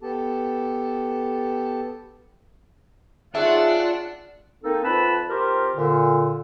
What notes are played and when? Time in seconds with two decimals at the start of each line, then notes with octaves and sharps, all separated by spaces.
0.03 B3 G4 A4 A5
3.35 D4 D#4 F4 G#4 C#5 E5 F#5
4.63 A#3 C4 D#4 A4
4.84 F2 B4 A5 B5
5.30 C4 F4 G4 A#4
5.76 A#2 D3